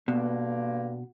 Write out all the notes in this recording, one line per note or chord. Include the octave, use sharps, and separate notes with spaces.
G2 B2 D3 A#3